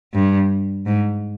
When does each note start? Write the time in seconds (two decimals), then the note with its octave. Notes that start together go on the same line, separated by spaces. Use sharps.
0.13 G2
0.86 G#2